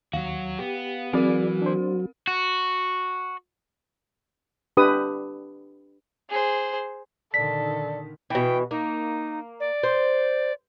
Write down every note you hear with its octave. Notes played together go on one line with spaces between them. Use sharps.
D#2 F#3 F#4 F5
B3 G4
E3 F#3 C4 F#4 G#4 A#4 D5
D4 C5
F#4
D4 G4 B4 D#6
G#4 C5
A#2 D3 D#3 A4 D5 B6
B2 E3 G5
A#3 D#4
D5
C5